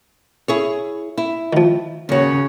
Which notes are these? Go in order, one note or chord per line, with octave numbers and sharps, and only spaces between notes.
E4 G#4 C#5
E4
D#3 F3
D#2 C#3 F#4 C#5